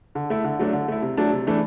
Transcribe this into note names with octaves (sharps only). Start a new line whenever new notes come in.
D3
A3 E4
D3
F#3 A3 D4
D3
A3 E4
C3
F#3 A3 D4
C3
E3 A3 D4